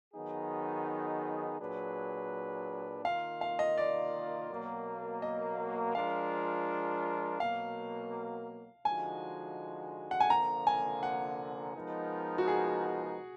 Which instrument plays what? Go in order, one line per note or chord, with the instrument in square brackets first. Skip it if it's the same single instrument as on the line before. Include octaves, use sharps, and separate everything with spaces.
[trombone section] D#3 F#3 B3 D#4 G#4
A#2 F#3 D4 G#4 B4
[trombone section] D#3 A#3 F4 [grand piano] F5
[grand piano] F5
D#5
D5
[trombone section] B2 F#3 A#3
[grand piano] D#5
[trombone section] F3 G#3 D4 F4 A#4 [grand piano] F5
[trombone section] B2 F#3 A#3 [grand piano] F5
[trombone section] D3 F3 G#3 D#4 F#4 [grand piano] G#5
[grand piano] F#5
G#5
[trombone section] D3 F3 A#3 [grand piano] A#5
[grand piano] G#5
F#5
[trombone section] F3 G#3 B3 D#4 A#4
[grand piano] F#4
G#4